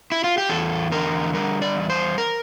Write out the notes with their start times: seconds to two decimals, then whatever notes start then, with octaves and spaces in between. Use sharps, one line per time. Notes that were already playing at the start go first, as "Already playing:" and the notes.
0.12 E4
0.24 F4
0.38 G4
0.49 E2 A4
0.92 D3 A#4
1.33 G3 A#4
1.62 D5
1.76 E2
1.90 C5
2.18 A#4